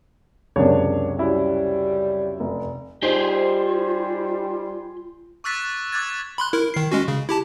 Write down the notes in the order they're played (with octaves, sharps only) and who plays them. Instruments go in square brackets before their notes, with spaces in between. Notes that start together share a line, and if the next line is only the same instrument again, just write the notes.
[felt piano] C#2 F#2 C3 [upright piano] A#3 D4 C#5
[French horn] G3 [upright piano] C#4 E4 F#4
[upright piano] F1
[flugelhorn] G3 [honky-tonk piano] D#4 C5 [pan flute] F4 [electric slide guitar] G4 G#4
[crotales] C#6 D6 E6 F#6 A6 B6
D6 E6 F#6 G#6 A6
[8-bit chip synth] B5 C6 F#6
E4 A#4
D#3 C7
G#3 C#4 F#4
C#3
E4 G4 A5